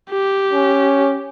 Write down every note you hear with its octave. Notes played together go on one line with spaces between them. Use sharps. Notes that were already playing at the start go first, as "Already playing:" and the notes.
G4
C#4